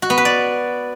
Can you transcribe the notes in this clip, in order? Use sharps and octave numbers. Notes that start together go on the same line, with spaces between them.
F#4
B3
B4
D5